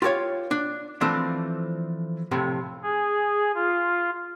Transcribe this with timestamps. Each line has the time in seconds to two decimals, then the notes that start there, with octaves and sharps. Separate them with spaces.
0.02 F4 G4 A#4 C#5 F5
0.51 D4
1.01 E3 F3 A3 C4 D4
2.31 F2 A2 C3
2.83 G#4
3.55 F4